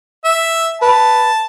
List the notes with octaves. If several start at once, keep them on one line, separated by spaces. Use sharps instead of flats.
E5
B4 A5